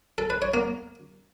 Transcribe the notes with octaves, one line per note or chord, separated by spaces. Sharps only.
A4
B4
C#5
A#3